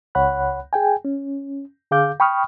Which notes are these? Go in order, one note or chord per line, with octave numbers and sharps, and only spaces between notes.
C#2 C#5 F#5 B5 F#6
G#4 G5 G#5
C#4
D3 G#4 F5 D6 G6
G5 B5 C#6 D#6 F6